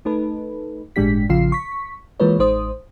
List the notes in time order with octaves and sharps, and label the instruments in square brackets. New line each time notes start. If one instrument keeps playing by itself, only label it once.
[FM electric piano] A3 D#4 A4 B4
G1 A2 G#3 D4 G4 B6
A1 C#3 F3 F4 F5 C7
C#6 B6
E3 G#3 A#3 F4 B4 C#5
A1 G#3 D#4 C5 D#6